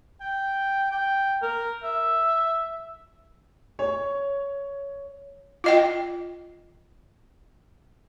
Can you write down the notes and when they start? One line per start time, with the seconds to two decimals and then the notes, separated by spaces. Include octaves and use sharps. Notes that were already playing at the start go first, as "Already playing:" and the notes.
0.21 G5
0.91 G5
1.42 A#4
1.83 E5
3.79 C#5
5.64 F4 D#5 G5